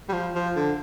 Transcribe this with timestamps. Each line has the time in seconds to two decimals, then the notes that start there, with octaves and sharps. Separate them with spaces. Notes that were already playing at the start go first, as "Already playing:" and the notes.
0.09 G3
0.13 F3
0.35 F3
0.56 D3